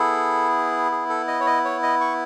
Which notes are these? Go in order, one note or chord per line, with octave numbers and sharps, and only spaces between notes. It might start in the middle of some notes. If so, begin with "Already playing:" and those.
Already playing: B3 E4 G#4 A4
G#4
A4
D#5
C#5
D#5
C#5
D#5
C#6